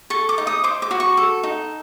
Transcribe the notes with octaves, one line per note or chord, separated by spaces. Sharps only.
A4 C#6
D6
D#4
D#6
C5 D6
D6
F#4
C#6
A4
D#4